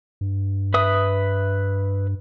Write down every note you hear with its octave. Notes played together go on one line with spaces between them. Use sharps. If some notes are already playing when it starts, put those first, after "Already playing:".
G2
B4 E5 D#6